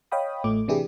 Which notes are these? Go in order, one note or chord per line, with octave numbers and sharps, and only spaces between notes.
C#5 D#5 F5 G5 B5 D#6
A1 A2 A3 F4 D6
C3 E3 D4 E4 G4 G#4